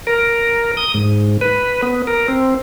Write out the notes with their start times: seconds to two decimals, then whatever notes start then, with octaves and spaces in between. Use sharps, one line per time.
0.07 A#4
0.77 D#6
0.94 G#2
1.41 B4
1.82 B3
2.07 A#4
2.28 C4